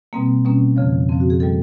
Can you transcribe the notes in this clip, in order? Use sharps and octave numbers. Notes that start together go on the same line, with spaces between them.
B2 G3 A#3 C4
B2 G3 A#3 C#4
F2 C#3 F3
F2 C#3 F3 C4
F#4
G#4
D#3 G3 A#3 A4